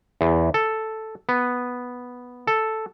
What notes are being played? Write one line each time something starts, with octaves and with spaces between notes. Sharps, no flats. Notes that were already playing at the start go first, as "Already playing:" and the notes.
E2
A4
B3
A4